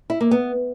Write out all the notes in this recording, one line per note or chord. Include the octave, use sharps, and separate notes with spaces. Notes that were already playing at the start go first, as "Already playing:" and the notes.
E4
A#3
B3